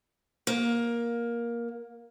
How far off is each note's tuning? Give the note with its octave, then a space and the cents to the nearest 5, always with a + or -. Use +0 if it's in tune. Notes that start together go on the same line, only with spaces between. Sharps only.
A#3 +15